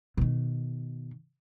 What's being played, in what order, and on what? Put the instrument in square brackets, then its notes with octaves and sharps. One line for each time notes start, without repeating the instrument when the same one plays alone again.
[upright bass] B2 D#3